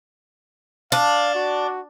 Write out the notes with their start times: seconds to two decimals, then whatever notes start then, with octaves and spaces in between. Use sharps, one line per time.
0.92 D4 F5
1.35 F#4